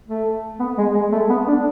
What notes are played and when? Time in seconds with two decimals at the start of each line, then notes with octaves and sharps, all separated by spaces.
0.08 A3
0.60 B3
0.78 G#3
0.95 G#3
1.12 A3
1.30 B3
1.48 D4